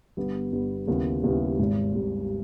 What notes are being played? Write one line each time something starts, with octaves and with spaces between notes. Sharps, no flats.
G1 G2 G3 B3
G1 G2 G3 B3
D#2 C#3 G3 B3 E4
D#2 C#3 G3 B3 E4
G#1 G#2 G3
G#1 G#2 G3